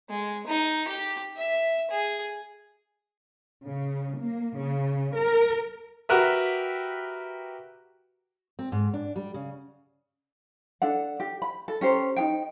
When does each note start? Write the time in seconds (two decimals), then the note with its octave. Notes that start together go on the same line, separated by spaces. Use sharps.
0.10 G#3
0.47 D#4
0.88 G4
1.37 E5
1.91 G#4
3.66 C#3
4.18 A#3
4.57 C#3
5.15 A#4
6.09 F#4 G4 A#4 B4 E5
8.59 C4
8.72 G#2
8.94 D4
9.16 G3
9.34 C#3
10.82 D4 A4 F#5
11.20 G4
11.42 B5
11.68 A4
11.81 C#4 G4 C5 A#5
12.16 D#4 G#4 G5